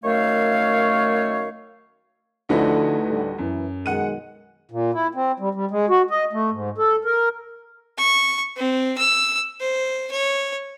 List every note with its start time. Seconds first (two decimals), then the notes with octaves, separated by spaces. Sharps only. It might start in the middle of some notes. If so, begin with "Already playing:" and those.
0.04 F#2 D#3 A3 C#5 F5
2.49 D2 D3 F3 A3 D#4 E4 F#4 B4
3.08 A2 D3 G3
3.38 F#2 E3
3.86 B1 D#3 G#3 F#5 D#7
4.71 A#2
4.94 E4
5.15 C4
5.40 G3
5.55 G3
5.71 G#3
5.89 F#4
6.10 D#5
6.33 A3
6.51 G#2
6.78 A4
7.05 A#4
7.98 C#6
8.56 C4
8.98 E6
9.60 C5
10.11 C#5